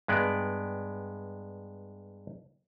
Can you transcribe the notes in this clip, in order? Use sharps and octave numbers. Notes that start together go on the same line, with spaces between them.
G2 G#3 B3 D5